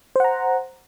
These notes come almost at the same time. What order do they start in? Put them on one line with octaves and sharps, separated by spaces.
C5 F#5 A#5